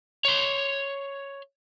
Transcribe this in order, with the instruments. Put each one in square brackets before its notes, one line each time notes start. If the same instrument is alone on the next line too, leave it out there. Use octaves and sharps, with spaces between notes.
[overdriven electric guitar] C#5 C6